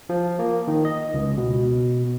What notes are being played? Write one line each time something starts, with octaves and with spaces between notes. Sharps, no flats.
F3
A#3
D#3
D#5
C#2
B2